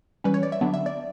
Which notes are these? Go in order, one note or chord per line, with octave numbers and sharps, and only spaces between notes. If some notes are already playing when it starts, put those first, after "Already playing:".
E3 G3 C#4 B4
C#5
D5
E5
D3 F#3 B3 D4
E5
D5